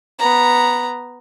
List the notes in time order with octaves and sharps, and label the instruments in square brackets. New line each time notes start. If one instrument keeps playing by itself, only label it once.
[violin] B3 A#5